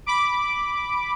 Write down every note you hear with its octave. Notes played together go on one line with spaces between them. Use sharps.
B5 D6